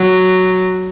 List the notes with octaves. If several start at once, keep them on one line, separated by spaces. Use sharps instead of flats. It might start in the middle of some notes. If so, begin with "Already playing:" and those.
Already playing: F#3